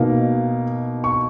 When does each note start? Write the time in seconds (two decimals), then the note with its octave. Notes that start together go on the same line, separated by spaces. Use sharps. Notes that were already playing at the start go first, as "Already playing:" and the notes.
Already playing: B2 A#3 D#4
1.04 C#6